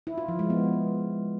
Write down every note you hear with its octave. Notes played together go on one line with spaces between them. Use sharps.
E4
F4
F3
G#3
B3